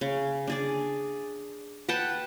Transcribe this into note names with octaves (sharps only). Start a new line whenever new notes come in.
C#3
D4 G#4 D5
B4 F#5 G5 A5